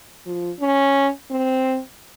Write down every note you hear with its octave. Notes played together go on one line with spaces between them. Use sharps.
F3
C#4
C4